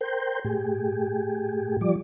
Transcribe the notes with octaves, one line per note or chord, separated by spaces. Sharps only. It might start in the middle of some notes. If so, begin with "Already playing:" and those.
A#4 C5 G5
A2 G4 G#4
F3 G3 D5